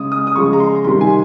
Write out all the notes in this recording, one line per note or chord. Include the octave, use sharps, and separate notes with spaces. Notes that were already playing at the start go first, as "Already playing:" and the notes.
Already playing: C#3 G#3 D#6
D#6
D#6
C#3 F3 G#3 C#6
A#5
C6
C3 D#3 G3 C6
G#5